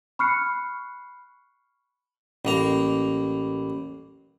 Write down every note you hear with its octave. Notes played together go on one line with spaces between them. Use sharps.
B5 C#6 F6 F#6 C7 C#7
A1 A#3 A#5